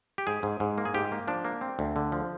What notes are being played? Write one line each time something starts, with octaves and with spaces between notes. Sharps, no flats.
G4
G#2 G#4
G#2
G#2
A#3
G#4
G#2 G4
A#3
F3 D4
A#3
C4
D2
D3
F3